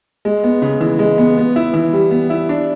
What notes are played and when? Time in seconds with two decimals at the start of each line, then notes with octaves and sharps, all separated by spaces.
0.25 G#3
0.44 B3
0.62 C#3
0.81 E3
0.99 G#3
1.18 B3
1.37 B3
1.56 E4
1.74 E3
1.93 G3
2.11 B3
2.30 E4
2.49 D4